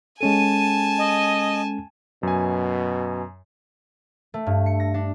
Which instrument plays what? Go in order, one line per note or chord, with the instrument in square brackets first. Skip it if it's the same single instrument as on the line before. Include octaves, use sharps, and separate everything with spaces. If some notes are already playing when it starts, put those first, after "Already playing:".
[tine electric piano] G#3 C#4 A4 [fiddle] G#5 A5 [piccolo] D#7
[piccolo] D#5
[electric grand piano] F#2 G#5 [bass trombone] B2
[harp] A3
G2
C#7
A#6
D4